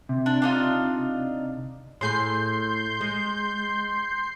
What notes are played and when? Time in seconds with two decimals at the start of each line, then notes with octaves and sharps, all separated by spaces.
0.09 C3
0.26 D4
0.42 D4 D#4 F4
2.01 A2 G#4 B4 C6 G6 C7
3.01 G#3